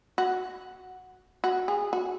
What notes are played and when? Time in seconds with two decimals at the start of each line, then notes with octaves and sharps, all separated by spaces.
0.18 F#4
1.44 F#4
1.68 G#4
1.93 F#4